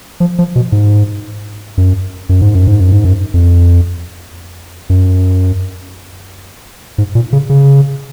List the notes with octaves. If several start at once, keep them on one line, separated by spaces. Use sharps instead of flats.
F3
F3
B2
G#2
F#2
F#2
G#2
F#2
G#2
F#2
G#2
F#2
F2
F#2
G#2
A#2
C#3
C#3